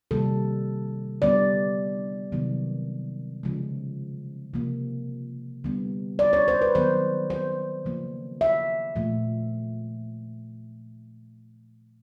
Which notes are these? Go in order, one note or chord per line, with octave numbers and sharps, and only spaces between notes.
C3 D#3 G3 A#3 A4
D3 G3 B3 D5
C3 D#3 F#3 B3
C#3 F3 G#3
C3 F3 A#3
D3 G3 B3
D5
C#5
C5
B4
D#3 F#3 B3 C5
C5
C#3 F3 A#3
E5
A#2 F3 A3